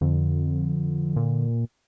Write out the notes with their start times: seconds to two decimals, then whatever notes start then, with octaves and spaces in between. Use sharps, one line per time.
0.01 F2 D3
1.16 A#2